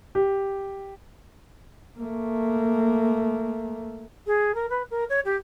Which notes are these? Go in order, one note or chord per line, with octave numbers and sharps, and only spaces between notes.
G4
A3 A#3
G#4
A#4
B4
A#4
C#5
G4